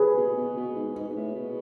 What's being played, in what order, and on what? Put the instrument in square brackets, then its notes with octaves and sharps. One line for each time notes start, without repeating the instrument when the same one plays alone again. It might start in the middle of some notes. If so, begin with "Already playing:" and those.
Already playing: [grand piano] G#4 B4
[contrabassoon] B2
B2
B2
G#2
G#2
B2
A2
B2